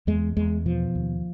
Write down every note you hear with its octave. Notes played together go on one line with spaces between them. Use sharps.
E2 G#3
E2 G#3
B2 F3
D#2